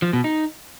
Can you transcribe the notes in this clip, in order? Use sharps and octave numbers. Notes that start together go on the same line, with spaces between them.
F3
B2
D#4